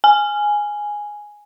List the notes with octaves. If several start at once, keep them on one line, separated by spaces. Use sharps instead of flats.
G#5